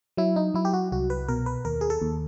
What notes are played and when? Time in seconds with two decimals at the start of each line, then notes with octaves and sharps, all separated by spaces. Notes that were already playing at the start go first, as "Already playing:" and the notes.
0.17 F#3 E4
0.36 D#4
0.54 F#3 E4
0.65 G4
0.73 F#4
0.92 C2 F#4
1.10 B4
1.28 B2 A#4
1.46 B4
1.65 D#2 A#4
1.81 G#4
1.90 A4
2.02 D#2